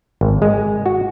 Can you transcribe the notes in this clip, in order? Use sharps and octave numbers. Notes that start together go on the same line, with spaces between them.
G#1
G#3
F#4